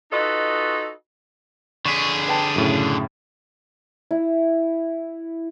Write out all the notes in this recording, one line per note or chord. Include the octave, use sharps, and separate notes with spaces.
D#4 F4 F#4 A4 B4 D#5
D3 G#4 C#6 B6
B4 G5 A5
F#2 A2 C#3
E4